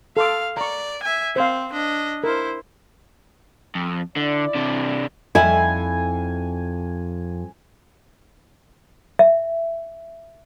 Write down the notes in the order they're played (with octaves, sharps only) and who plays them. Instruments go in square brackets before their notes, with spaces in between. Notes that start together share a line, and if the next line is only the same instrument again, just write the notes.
[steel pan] A4 C6 D6 [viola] F5
[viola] D5 [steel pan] A#5 C#6
[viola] E5 G#5
[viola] C4 [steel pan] C5 F5
[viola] D4 D#5
[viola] E4 C5 [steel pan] A#4
[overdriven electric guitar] F2
[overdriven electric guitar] D3 [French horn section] E4 D5
[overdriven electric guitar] C3 D4
[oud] F2 E4 [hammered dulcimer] G#5
[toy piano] E5